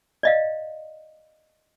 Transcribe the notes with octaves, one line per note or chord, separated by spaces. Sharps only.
D5 D#5 F5